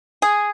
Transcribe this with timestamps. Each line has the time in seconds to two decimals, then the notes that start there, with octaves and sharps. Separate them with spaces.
0.22 G#4